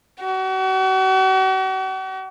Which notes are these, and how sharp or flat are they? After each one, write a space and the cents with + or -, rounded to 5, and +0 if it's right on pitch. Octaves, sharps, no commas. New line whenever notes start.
F#4 +40